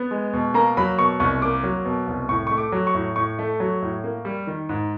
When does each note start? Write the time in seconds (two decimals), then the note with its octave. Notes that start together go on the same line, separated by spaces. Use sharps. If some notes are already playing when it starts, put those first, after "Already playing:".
Already playing: B3
0.11 G#3
0.33 B2
0.54 A#3 A#5
0.77 F#3 B5
0.99 B2 C#6
1.20 C2 C#6
1.42 A#3 D6
1.64 F#3
1.85 B2
2.07 C2
2.29 A2 C#6
2.47 A3 C#6
2.58 D6
2.72 F#3
2.87 C#6
2.95 A2
3.16 A2 C#6
3.39 A3
3.60 F#3
3.82 A2
4.04 A#3
4.25 G3
4.47 D#3
4.69 G#2